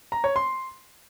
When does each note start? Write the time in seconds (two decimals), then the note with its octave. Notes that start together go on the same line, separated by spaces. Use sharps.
0.12 A#5
0.24 C#5
0.36 C6